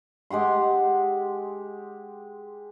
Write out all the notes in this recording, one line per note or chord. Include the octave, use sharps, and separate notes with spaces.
G#3 G4 F#5 C6